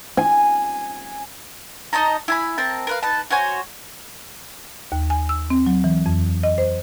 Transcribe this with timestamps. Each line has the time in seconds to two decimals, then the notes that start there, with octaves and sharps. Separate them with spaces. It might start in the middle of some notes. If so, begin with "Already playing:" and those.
0.17 G#5
1.93 D#4 D#5 A5 A#5
2.28 E4 G#5 B5
2.58 C4 A#4 A5
2.87 A#4 B4 F5
3.03 D#4 B4 A5
3.30 F#4 C5 C#5 G#5
4.92 D#2
5.10 G#5
5.29 E6
5.50 C4
5.66 F#3
5.84 E3
6.06 F2
6.43 D#5
6.58 C5